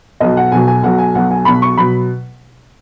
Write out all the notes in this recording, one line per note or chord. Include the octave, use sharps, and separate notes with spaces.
B1 B2 F#3 D#5
F#5
B1 B2 F#3 G#5
G#5
B1 B2 F#3 F#5
G#5
B1 B2 F#3 F#5
G#5
B1 B2 F#3 B5
C#6
B2 F#3 B5